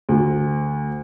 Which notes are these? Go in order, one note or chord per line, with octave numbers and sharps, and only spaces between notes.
D2